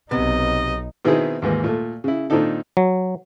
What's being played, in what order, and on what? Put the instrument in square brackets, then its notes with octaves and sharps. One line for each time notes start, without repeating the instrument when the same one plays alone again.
[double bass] B1 D#4 [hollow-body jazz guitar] C3 B3 [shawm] D#5
[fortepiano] B2 D#3 B3 C4 E4 G#4
D#2 G#2 E3 A#3
A#2 A3
C#3 E4
A#2 D#3 C4 D4 D#4 A4
[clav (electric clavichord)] F#3